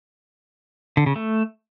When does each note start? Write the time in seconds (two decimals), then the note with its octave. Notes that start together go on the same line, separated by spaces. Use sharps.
0.97 D3
1.06 C#3
1.16 A3